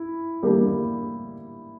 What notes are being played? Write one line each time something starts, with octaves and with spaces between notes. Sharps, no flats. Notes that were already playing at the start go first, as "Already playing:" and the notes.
Already playing: E4
G3 A#3 D4